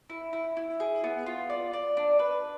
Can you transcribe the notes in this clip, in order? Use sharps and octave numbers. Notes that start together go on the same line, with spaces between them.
E4
E4
E4
G#4
B3
F4
D5
D5
D4
B4